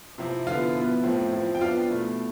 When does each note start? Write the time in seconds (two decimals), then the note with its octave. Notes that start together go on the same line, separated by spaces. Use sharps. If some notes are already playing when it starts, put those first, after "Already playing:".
0.18 C3 F3 C4 E4
0.47 D3 F3 B3 E4 F4 F5
0.75 B2 B3 E4
1.03 A2 F3 C4 E4
1.33 F3 C4 E4
1.55 G5
1.61 F3 B3 D4 F4 F5
1.89 B2 A3 E4